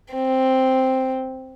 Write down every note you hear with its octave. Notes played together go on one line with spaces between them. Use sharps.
C4